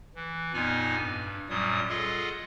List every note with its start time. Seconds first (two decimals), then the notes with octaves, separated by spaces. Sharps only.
0.15 E3
0.53 F2 A#2 B3 D#4 G#5
0.96 G2
1.49 F#2 A#2 F#3 G3 D#6
1.89 F4 G#4 A4 D#5 F#5